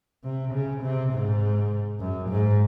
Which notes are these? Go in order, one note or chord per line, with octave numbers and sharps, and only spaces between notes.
C3
C#3
C3
G#2
F#2
G#2